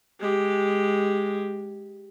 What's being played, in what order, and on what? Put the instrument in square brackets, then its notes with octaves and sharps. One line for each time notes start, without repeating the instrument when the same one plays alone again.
[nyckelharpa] G#3 G4